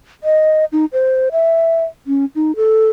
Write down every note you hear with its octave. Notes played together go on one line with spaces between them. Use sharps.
D#5
D#4
C5
E5
C#4
D#4
A4